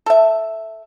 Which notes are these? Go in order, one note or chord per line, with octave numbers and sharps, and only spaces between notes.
A4 E5